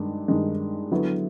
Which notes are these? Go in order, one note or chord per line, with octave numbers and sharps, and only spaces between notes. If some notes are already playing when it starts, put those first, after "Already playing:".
Already playing: G2 D#3 G#3
G2 D#3 G#3
D3 F#3 B3 E4